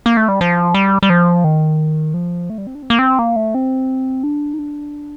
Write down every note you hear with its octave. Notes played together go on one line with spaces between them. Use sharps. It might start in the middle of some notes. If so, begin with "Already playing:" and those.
A#3
A3
G3
F3
G3
G3
F3
D#3
F3
A3
G3
C4
D4
C4
A#3
C4
A#3
A3
C4
D4
D#4
D4